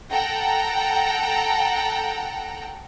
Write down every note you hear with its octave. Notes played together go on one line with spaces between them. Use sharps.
A4 F#5 G5 A#5